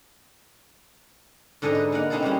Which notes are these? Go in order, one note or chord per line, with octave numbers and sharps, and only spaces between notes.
G#2 D3 A4 D#5 G#5 A#5
B4
A#3 D#4 A#4 B4 F#5
C4 C#4 D#4 E4 G#4 A4
G3 G#3 A#3 C4 C#4 E4